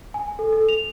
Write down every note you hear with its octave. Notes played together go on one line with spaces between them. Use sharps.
G#5
A4
A4
F7